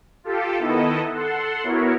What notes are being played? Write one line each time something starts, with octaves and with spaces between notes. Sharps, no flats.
F4 G4 A4
D#3 B3 E4 A4 D#5
A4 F#5 C6
B3 E4 F#4 A#4 C#5